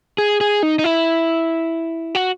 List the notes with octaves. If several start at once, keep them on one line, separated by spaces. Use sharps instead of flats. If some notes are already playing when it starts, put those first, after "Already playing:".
G#4
G#4
D#4
D#4
E4
F#4